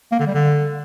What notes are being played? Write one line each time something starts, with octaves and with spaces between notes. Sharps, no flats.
A#3
D3
G3
D3